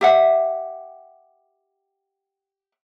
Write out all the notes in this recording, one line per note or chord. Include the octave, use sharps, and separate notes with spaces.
G4 E5 F#5